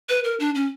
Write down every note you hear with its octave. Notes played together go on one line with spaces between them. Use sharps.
B4
A#4
D4
C#4